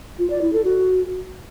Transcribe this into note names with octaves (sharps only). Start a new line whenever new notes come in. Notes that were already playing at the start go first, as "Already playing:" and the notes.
F4
D5
E4
A4
F#4